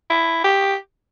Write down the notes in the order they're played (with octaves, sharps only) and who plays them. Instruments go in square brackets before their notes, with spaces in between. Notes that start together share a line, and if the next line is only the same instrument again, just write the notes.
[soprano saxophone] E4
G4